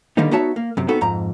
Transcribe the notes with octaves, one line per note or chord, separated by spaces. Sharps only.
D3 D#3 G3 A#3 B3 D#4
B3 D#4 F#4 C#5 E5 A5
A#3
F#2 C3
B3 C4 D#4 F#4 A4 B4
F2 G#2 A#5